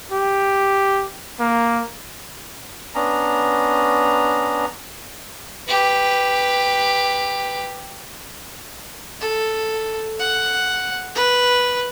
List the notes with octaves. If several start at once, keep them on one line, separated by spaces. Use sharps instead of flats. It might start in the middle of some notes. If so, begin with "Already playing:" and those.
G4
A#3
B3 C#4 D4 A#5
G4 B4
A4
F#5
B4